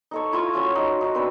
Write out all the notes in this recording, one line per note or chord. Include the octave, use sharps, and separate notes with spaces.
D#4 A4 C#5
E4 F4 F5 C#6
F#3 C#4 F4
D#4 C6
D#4 F#4
C4 D4 B4